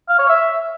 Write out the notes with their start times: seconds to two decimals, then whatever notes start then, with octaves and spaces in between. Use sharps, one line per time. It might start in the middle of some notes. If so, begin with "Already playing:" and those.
0.09 F5
0.19 C#5
0.29 E5